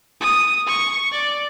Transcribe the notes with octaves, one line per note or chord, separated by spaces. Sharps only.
D#6
C#6
D5